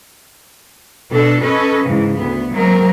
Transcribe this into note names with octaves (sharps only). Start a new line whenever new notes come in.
B2 D4 A4
C#4 A4 B4 D#5
G#2 C#3 E3
D2 B3
F#3 G#3 A#3 C4 A#4